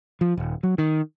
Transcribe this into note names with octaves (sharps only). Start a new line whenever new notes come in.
F3
D#1
F#3
D#3